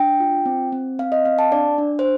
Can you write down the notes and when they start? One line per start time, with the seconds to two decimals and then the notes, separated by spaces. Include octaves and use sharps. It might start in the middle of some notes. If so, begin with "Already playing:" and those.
Already playing: D4 G5
0.20 F4
0.46 C4
0.72 C4
0.99 C4 F5
1.12 D#5
1.25 C4 F5
1.39 A5
1.51 D4 D5
1.78 D4
1.99 C5